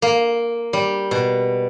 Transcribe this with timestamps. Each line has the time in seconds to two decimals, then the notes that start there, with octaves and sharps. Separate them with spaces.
0.02 A#3
0.73 G3
1.11 B2